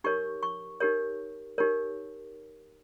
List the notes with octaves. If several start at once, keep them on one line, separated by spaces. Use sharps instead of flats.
D#4 G4 A#4 C#5 C#6
C#6
D#4 G4 A#4 C#5
D#4 G4 A#4 C#5